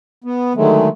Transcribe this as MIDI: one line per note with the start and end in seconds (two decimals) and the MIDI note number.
0.24 0.53 59
0.56 0.89 50
0.56 0.89 51
0.56 0.89 54
0.56 0.89 56
0.56 0.89 57